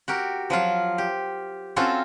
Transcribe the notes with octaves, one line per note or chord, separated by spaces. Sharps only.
F#4 G4 A#4
F3 F#3 F4
G4
C4 C#4 F4 F#4 A4